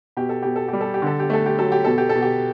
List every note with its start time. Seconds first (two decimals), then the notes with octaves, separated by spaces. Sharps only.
0.17 B2 G4
0.29 A4
0.43 B2 G4
0.56 A4
0.68 G3 G4
0.81 A4
0.94 G4
1.02 D3 A4
1.20 G4
1.30 A3 A4
1.46 G4
1.59 F#3 A4
1.72 G4
1.84 B2 A4
1.98 G4
2.09 A4
2.15 B2
2.22 G4